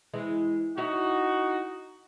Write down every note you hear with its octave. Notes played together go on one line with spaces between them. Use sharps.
E3 G#3 E4
D#4 E4 F#4 C#5